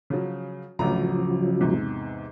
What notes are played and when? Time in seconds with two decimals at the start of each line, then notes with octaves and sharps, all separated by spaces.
0.10 C#3 F3 F#3
0.79 A1 D2 C#3 F3 F#3 A#5
1.60 E2 G#2 C3